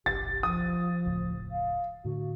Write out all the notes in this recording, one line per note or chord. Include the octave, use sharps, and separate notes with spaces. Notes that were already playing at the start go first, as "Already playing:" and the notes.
F#1 B1 G4 A6
F3 D#6
E1 C#2 A2
F5
A2 D3 F#4